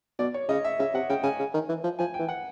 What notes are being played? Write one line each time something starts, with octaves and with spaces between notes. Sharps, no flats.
B2 D5
C#5
C#3 D#5
E5
C#3 E5
C3 F#5
C#3 G5
C#3 G#5
C#3
D#3
E3
F3
F3 G#5
G5
E3
F#5